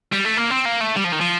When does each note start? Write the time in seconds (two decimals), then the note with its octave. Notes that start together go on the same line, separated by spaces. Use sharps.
0.13 G3
0.25 A3
0.37 A#3
0.51 C4
0.65 A#3
0.81 A3
0.96 G3
1.04 F3
1.12 D#3
1.20 F3